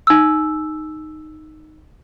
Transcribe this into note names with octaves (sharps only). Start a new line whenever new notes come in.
D#4 E6